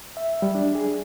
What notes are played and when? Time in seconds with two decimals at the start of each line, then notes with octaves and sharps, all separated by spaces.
0.17 E5
0.42 G3
0.55 D4
0.75 G#4